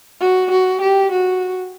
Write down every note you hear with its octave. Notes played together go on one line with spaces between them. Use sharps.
F#4
F#4
G4
F#4